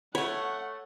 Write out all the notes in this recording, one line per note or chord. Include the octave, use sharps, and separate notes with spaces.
A3 C#5 F#5 B5